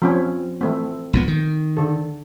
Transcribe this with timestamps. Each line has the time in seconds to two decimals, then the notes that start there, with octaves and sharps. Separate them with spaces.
0.02 F3 C4 C#4
0.61 E3 A3 C4
1.13 A#1 A#2 B3
1.28 D#3
1.77 D3 A4